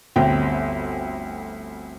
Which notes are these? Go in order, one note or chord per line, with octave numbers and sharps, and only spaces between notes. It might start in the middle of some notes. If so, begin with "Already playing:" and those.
G1 D2 C4 G5